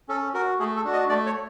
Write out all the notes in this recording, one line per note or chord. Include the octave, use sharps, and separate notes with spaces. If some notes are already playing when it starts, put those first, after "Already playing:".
C#4 A4
F#4 A#4
A3 G#4
A4
D4 F#4
D#5
A3 D5
C#5